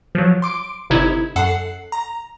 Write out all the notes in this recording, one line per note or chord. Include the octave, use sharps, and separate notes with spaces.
F3 F#3
C6 D6 D7
G1 C3 D#4 E4 G#6
F#2 A4 F#5 C7
A#5